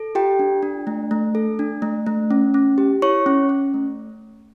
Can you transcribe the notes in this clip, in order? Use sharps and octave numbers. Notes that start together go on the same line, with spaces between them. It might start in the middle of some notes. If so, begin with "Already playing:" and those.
Already playing: A4
F4 G4 G5
D4
D4
A3
A3
A4
D4
A3
A3
C#4
C#4
G4
E4 C#5 C#6
C#4
C#4
A3